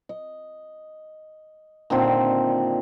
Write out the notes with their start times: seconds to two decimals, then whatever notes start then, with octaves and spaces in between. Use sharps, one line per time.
0.09 D#5
1.90 A#2 D3 D#3 C4